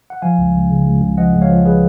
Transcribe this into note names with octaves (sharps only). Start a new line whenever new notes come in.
F#5
F3 F5 G#5
C#2
C#2
C#3
C#2
C#2
F3 D#5 F#5
C#2
C#5 F5
F3
G#4 B4